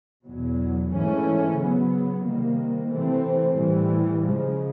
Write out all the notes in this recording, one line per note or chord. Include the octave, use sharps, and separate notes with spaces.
E2 B2 F#3
G#2 E3 A3 C#4
C#3 F#3 B3
C3 D#3 G3 A#3
C3 E3 A3 C4
A2 E3 G3
C#3 F3 G#3